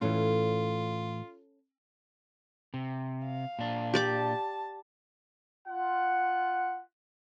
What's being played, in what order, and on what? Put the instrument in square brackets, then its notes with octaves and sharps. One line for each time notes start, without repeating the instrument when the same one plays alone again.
[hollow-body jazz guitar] A2 E3 [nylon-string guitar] C#4 A4 [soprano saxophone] F4
[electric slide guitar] C3
[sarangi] F5
[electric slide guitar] A#2 D4
[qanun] G4 D5 D6 [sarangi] A5
[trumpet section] F4 F#5